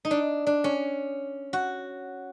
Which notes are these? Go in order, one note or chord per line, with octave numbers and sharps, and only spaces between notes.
D#4
D4
D4
C#4
F#4